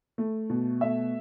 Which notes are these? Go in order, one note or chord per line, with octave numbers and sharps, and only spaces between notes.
A3
B2
A3 E5